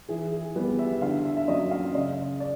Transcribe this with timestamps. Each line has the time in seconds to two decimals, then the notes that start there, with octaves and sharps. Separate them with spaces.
0.09 E3 G#4
0.32 G#4
0.56 G3 B4
0.59 B3
0.79 E5
1.02 D3 F5
1.25 E5
1.37 E5
1.48 F#3 A#3 C#4 D#5
1.71 F5
1.94 C#3 D#5
2.40 D5